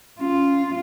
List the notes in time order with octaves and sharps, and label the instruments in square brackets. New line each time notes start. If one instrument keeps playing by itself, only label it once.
[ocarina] C#4 [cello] F4